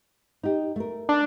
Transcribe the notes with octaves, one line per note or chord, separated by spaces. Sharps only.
D#4 G4
A3 A#4
D4